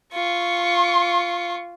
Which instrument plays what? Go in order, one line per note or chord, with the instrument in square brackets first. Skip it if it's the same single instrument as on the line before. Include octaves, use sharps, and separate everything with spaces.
[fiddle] F4 [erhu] C#6